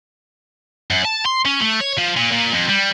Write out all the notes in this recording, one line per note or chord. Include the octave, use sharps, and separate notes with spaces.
F#2
A5
C6
C#4
A3
C#5
F3
A#2
A#2
F2
G3